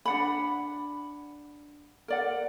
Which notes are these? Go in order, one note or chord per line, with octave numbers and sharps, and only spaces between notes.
D4 F#5 B5
A#4 D5 F#5